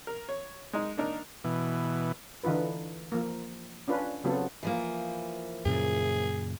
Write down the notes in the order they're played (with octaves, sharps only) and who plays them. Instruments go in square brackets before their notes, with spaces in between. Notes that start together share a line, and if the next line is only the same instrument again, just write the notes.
[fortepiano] A#4
C#5
G#3 D#4
A#3 D4 D#4 A#4
[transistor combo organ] B2 E3
[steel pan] D3 E3 D#4 F4 B4
F3 A#3
C#4 D4 F4 B4
C#3 F#3 B3 C4 F4 A4
[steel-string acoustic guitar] E3 F3 A#3
[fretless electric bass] F#2 A#2 C#3 [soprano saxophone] G#4